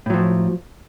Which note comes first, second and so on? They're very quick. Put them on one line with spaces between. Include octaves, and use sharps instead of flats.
A2 F#3 F3